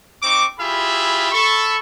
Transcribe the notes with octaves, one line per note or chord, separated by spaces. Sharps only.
C4 D#4 C#6 D6
E4 F4 G4 G#4 E5 B5
A4 B5 C#6